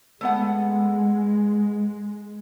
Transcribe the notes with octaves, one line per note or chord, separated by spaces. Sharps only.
G#3 A3 B3 F#5